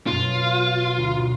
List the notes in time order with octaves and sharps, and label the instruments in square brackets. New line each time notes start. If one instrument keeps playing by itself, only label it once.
[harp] F#2 B2 [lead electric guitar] F4
[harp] D2
B2